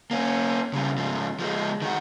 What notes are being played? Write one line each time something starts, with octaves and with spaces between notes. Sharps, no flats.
A#3 C#4
C#3 G3
G#2 F3
F3 G#3
D#3 F#4